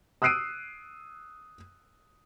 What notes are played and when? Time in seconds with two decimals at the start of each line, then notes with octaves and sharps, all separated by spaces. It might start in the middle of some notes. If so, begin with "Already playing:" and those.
0.22 D#6 E6 F#6 C7 D7 D#7